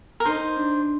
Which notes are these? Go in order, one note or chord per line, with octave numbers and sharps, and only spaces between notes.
A#4
D#4 C5
D4